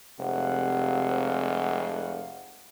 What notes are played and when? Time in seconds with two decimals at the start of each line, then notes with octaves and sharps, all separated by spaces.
0.19 F1 C3 G#3 F5 F#5